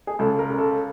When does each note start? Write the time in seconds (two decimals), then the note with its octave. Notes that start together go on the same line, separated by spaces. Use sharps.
0.07 G#4
0.19 C#2 A4
0.39 A#4
0.49 C#3
0.54 A#4
0.58 A4